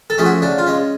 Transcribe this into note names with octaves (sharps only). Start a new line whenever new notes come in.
A4
F3 A3 C#4 G#4
F#4
C#3 D4
F4
G#3 C#4